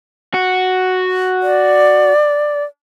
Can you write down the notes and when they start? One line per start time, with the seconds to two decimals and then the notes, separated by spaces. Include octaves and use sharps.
0.34 F#4
1.42 D5